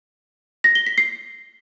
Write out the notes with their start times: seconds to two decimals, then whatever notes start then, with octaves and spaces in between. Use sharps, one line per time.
0.64 A#6
0.75 G7
0.86 B6
0.98 C7